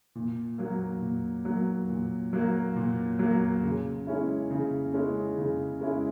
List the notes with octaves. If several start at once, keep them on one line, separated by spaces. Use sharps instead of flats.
A#2
F#3 A#3
A#2
F#3 A#3
A#2
F#3 A#3
A#2
F#3 A#3
C#3
G#3 C#4 E4
C#3
G#3 C#4 E4
C#3
G#3 C#4 E4